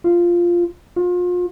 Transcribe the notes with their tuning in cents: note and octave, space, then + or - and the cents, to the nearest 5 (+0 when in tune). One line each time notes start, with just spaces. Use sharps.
F4 -5
F4 +35